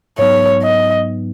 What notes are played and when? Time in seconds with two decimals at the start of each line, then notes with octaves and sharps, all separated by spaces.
0.18 G#2 F#3 B3 D#4 C#5
0.63 D#5